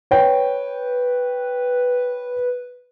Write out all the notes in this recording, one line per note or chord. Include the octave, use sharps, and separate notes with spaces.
B4 C#5 G5